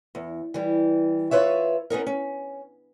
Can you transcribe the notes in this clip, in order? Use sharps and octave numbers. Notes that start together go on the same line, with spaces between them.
E2
E3 G3
F4 B4 C#5 E5
B3 C#4 D#4 A#4
C#4